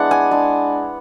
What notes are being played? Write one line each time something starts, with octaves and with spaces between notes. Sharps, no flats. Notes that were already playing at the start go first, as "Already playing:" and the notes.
Already playing: G#3 B3 D4 E4 F#5
G#5
G#3 D4